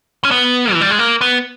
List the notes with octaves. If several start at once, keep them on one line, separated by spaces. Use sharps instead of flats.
C#4
B3
E3
G3
G#3
A#3
B3